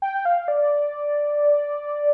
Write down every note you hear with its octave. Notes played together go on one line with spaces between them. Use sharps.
G5
F5
D5